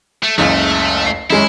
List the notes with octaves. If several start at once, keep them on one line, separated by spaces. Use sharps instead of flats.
A3
F#1 C#2 A3
C7
F#2 G#3 C#4 E4